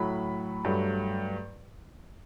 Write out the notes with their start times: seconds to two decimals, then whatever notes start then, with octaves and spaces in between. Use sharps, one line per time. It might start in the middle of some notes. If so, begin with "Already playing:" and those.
Already playing: A2 F#3 A3 B5
0.65 G2 F#3 A3